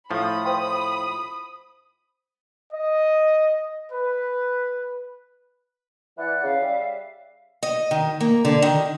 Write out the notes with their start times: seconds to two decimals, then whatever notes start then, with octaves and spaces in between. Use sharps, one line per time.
0.11 A2 F3 B5 D#6
0.45 C5 G5 C6
2.72 D#5
3.91 B4
6.18 E3 D5 F#5 F#6
6.43 C#3 E5 F5
6.61 G3
7.63 D#5
7.91 D#3
8.21 A#3
8.45 D3
8.62 D#3